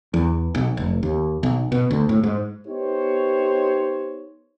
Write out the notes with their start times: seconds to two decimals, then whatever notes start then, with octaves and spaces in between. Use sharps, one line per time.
0.14 E2
0.55 B1
0.77 F1
1.03 D#2
1.43 B1
1.72 B2
1.91 D2
2.09 A2
2.23 G#2
2.68 B3 D#4 G4 C5 C#5